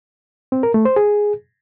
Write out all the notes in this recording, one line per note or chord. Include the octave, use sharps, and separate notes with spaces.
C4
A#4
A3
C5
G#4